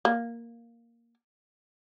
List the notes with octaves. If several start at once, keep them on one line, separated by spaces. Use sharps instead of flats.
A#3